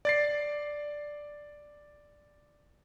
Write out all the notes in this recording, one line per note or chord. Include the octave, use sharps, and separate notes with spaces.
D5 A6 C7